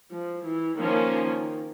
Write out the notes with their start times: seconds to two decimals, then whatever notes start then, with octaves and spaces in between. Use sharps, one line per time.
0.12 F3
0.45 E3
0.78 D#3 F3 A#3 C#4
1.12 D#3